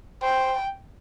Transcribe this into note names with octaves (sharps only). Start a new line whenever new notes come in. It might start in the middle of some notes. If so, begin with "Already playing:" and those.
C5 G5